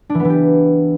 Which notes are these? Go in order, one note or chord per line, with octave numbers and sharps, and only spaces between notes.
D4
E3
B3
E3
G4